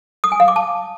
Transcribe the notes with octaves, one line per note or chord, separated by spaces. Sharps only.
D#6
G#5
F5
D6
A5